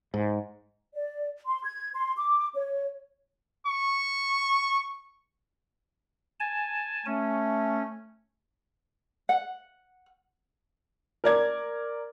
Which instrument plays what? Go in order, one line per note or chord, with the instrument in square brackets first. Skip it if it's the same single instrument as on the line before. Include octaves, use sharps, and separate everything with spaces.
[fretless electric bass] G#2
[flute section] D5
C6
G#6
C6
D6
C#5
[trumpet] C#6
[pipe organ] G#5 A5
[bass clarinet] A3 [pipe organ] C#4
[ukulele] F#5
[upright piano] A#4 D5 G#6